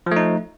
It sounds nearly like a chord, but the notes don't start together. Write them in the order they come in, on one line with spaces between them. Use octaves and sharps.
F3 A3 D#4